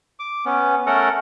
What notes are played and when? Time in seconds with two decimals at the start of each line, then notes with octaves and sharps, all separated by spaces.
0.19 D6
0.46 B3 C#4
0.87 A3 C#4 A4 A#4 F#5